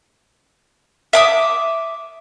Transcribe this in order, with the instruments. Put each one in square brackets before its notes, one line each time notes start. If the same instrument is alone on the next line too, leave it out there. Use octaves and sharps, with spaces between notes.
[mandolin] E5 D6 D#6